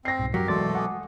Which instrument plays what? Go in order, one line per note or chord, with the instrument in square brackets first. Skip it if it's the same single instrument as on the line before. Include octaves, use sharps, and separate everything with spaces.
[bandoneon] C4 [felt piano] A#6 C7
[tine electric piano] C2 G#2 B2
[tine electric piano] F#2 B6 [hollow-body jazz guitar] F#3 [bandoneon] G4 A#4
[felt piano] E1 C6 [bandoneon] B2 A3 A4 [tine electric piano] D5 D6 A6
[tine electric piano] F#5 G#5 D#6 [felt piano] D6